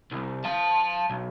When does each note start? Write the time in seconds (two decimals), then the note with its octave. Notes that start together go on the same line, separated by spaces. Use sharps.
0.12 C2
0.44 F5 A5
1.10 B1